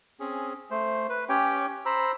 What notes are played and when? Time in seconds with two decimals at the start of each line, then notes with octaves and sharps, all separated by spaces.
0.20 C4 C#4 G#4
0.71 A3 C5
1.09 B4
1.29 C#4 G4 C#5 G5
1.86 C5 A#5 B5 E6